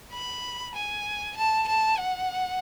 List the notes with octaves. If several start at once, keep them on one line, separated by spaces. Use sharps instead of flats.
B5
G#5
A5
A5
F#5